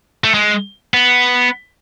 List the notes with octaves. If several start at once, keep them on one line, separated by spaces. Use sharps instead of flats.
A3
G#3
B3